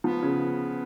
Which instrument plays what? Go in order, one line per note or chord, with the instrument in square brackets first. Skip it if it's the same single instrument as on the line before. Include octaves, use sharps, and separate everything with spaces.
[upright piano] F3 [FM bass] B3
[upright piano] C#3